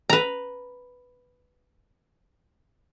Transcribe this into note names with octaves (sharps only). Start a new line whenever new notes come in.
B4 A#5